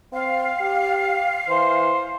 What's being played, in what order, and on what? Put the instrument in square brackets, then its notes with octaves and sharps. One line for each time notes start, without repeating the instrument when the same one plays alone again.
[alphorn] C4 [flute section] F5
[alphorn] G4
[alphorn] E3 [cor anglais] C5